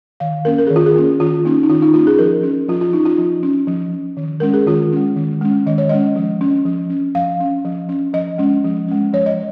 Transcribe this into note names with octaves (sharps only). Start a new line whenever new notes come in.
D#3 F5
A#3 C#4 A#4
A#4
D#3 G#4
F4
G#4
A#3 C#4
D#3 F4
A#3 C#4 D#4
D#4
D#3 F4
D#4
A#3 F4
C#4
G#4
F3 A#4
C#4
F3 F4
F4
C#4 D#4
F4
F3
C#4
F3
C#4
D#3
G#3 C#4 A#4
G#4
D#3 F4
G#3 C#4
D#3
G#3 C#4
D#3 D#5
C#5
G#3 C#4 D#5
F3
C#4
F3
C#4
F3 F5
C#4
F3
C#4
F3 D#5
G#3 C#4
F3
G#3 C#4
F3 C#5
D#5